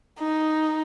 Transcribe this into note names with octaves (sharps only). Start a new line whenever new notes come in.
D#4